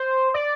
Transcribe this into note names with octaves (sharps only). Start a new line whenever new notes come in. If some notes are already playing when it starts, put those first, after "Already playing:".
Already playing: C5
D5